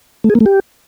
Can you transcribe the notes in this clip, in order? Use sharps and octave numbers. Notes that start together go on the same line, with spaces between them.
A3
G#4
A#3
A3
G4